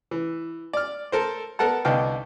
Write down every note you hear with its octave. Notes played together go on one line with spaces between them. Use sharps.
E3
D5 F6
A4 A#4 C5
B3 A4 A#4 F#5 A5
C2 D3 B3 D#4 F5 G5